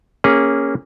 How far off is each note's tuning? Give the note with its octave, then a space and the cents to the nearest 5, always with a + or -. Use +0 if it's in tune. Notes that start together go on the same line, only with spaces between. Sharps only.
A#3 +0 C#4 +0 G#4 -20